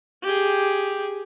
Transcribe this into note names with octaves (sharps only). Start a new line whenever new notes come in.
G4 G#4